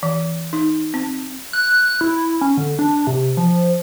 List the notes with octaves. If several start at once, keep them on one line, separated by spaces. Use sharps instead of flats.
E3
D#4
C4
F#6
E4
C#4
D3
D4
C3
F3